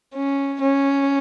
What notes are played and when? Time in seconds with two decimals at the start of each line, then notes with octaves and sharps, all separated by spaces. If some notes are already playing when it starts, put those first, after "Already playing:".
0.15 C#4
0.61 C#4